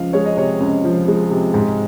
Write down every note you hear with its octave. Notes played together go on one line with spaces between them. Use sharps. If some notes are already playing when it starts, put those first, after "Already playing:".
Already playing: C#2 F3 F5
G#3 C#5
D#5
C3 C#5
C#2
F3
G#3
C3
G#2